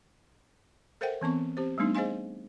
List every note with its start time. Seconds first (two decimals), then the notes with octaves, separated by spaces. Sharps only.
1.01 A4 A#4 C5 E5 F#5 G5
1.21 E3 B3 C4 C#6
1.57 C4 G4 C5
1.78 G3 A3 B3 D4 D#4
1.95 G#4 C5 D#5 F5 G#5 C6